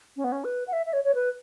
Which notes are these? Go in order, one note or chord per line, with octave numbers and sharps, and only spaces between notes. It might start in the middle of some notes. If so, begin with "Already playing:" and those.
C#4
B3
C#4
B4
F#5
E5
E5
C#5
C#5
B4